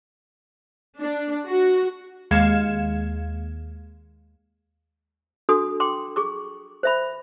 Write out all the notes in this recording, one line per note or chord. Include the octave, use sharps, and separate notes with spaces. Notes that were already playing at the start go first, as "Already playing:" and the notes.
D4
F#4
D#2 G#3 F5 G#6 C#7 E7
D4 F#4 A4 D#6
G5 C6 D6
G#4 C#6 D6
C5 E5 B5